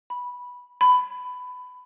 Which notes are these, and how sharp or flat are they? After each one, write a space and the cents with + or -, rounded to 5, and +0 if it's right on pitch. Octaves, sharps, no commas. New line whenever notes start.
B5 -10
B5 +15